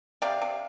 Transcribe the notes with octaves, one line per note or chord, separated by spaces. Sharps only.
C3 D5 F5
C3